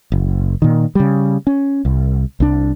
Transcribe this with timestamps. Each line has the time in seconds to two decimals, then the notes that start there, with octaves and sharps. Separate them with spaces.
0.12 F#1
0.62 A#2 D#3
0.95 C#3 G3
1.47 C#4
1.85 C2
2.40 C2 D4